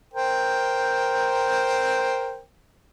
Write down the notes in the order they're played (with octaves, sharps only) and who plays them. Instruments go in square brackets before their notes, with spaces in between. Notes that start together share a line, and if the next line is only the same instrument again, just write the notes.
[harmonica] A#4 C5 G5